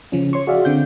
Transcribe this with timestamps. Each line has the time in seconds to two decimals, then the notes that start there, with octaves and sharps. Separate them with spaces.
0.12 C#3 F3 C#4
0.33 C#5 C6 C#6
0.47 F#4 G#4 D5 E5 F5
0.65 D3 C4 G6